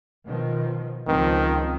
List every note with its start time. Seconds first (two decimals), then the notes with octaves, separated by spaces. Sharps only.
0.25 B2 D#3 F3
1.07 C#2 D#3 F3 C4